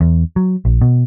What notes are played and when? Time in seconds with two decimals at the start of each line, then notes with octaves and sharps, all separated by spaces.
0.01 E2
0.36 F#3
0.65 A#1
0.82 B2